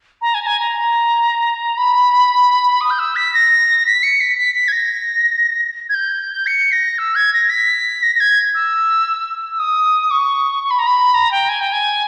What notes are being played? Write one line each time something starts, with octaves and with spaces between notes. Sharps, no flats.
A#5
G#5
A#5
G#5
A#5
B5
D#6
G6
E6
B6
A#6
B6
C#7
B6
B6
B6
G#6
A#6
G#6
G6
C#7
A#6
E6
G#6
A#6
B6
A#6
A#6
G#6
E6
E6
D#6
C#6
C#6
B5
A#5
B5
A#5
G5
G#5
G5
G#5